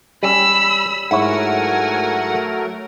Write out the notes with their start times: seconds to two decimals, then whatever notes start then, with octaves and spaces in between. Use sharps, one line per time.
0.23 G3 C#4 B5 E6
1.11 G#2 F#3 A3 E4 A#4 C#5 F#5 G#5